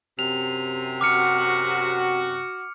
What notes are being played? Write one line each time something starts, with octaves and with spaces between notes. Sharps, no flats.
F#2 C3 F7
F#4 D6 F6 C#7